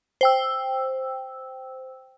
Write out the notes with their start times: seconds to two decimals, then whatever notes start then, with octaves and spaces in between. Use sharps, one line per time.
0.21 C5 G5 E6